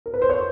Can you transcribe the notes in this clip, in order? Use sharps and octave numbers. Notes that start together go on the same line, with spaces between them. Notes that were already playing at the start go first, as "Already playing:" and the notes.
A#4
B4
C5
C#5